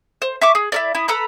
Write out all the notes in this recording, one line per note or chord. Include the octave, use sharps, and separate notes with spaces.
C5
E5 C#6 D6
G#4
E4 A#4 D5
E4 D#6
A4 B4 A#5 B5